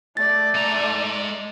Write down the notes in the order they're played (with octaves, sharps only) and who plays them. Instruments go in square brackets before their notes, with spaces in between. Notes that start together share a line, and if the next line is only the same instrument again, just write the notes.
[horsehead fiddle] A3 D5 [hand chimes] A6
[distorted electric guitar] G#3 A#5